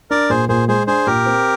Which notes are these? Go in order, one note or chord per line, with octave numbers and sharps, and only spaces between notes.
D4 A#4 D5
A#2 G#4 C5
A#2 G#4 C5
G#3 G#4 C5
D4 G#4 C5
A#2 G4 A#4
C4